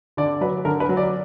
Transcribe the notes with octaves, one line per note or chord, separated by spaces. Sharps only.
D3 D5
F#3 B4
D3 A#4
B4
F#3
D5